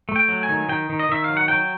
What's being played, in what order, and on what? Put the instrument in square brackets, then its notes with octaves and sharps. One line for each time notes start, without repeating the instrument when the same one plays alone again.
[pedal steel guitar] A3
G5
F#3
G#5
D#3
D#3 G5
D#3
D#5
D#3 E5
F5
F#3
F#5
F#3 G5